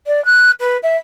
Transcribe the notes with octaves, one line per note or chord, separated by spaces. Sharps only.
D5
F#6
B4
E5